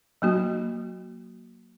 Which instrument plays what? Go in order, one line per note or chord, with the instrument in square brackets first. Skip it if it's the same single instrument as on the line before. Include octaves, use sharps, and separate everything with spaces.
[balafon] F#3 A#3 F#4